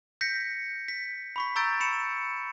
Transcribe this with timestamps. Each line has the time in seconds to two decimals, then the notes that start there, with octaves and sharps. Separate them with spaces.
0.21 G6 A#6 B6 C#7
0.88 B6
1.36 B5 C#6 B6
1.56 A#5 C#6 E6 G6 A6 D7
1.80 B5 C#7 E7